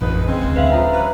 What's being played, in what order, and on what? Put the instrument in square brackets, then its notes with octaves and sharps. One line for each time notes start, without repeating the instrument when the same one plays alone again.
[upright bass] A1 F2 [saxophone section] G#3 D#4 B4
[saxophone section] C#3 G#3 C4
[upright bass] D1 D2
[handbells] B4 E5 F5
[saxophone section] F2 C#3 F3 [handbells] A#5
[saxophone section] G3 C#4 B4